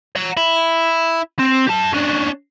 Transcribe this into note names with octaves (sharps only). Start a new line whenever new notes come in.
F#5 A#5
E4
C4
G4 A5
C#4 D4